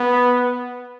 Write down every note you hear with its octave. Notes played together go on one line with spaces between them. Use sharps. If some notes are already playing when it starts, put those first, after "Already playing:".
Already playing: B3